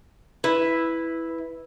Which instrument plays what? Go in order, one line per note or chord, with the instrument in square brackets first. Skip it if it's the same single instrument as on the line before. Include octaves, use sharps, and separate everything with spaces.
[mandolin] E4 [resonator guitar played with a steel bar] B4